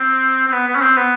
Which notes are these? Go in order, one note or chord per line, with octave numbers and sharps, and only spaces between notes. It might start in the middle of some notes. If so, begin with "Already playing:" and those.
Already playing: C4
C4
B3
B3
C#4
C4
B3